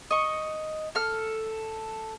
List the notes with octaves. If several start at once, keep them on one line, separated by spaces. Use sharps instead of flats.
D#5 C#6
A4 F6